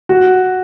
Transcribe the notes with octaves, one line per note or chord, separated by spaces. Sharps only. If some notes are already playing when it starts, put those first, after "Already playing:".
F#4